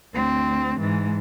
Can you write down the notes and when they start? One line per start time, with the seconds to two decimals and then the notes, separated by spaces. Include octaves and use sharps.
0.14 D2 C4
0.79 G#2 E3